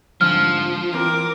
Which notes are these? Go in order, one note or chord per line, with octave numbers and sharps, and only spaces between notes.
F2 G#2 D3 F3 F6
E3 C4 A#4 D6